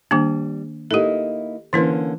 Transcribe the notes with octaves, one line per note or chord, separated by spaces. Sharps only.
D#3 G3 A#3 D4
A#3 D#4 E4 G4 A4
D3 E3 A#3 C#4 E4 B4